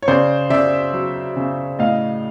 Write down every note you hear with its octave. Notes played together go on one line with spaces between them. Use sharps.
C#5
C#3 C5 D5
C#3 D5 E5
F#3
C#3
A2 D#5 F5